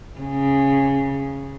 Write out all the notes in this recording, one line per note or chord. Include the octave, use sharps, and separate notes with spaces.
C#3